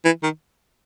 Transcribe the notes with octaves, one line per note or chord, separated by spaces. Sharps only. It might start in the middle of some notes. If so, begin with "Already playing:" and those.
E3
D#3